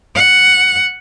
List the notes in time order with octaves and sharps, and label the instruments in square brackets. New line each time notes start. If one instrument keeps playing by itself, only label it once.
[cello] F#5